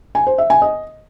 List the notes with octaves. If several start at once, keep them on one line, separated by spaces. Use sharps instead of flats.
G#5
C5
E5
G#5
D#5